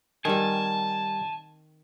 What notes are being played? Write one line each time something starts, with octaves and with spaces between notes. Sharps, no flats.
D#3 G3 C4 A#4 G#5 A5